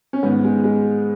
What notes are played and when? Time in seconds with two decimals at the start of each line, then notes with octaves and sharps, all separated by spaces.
0.13 C#4
0.23 G#2 D#3 B3
0.44 G#3
0.64 G#3